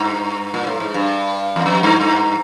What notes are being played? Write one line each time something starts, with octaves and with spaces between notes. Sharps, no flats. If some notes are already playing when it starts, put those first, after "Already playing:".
Already playing: G2
A#2
A2
G#2
G2
E2
F2
G2
G2